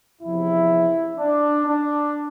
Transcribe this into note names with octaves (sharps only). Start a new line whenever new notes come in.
E2 C3 F3 E4
D4
D4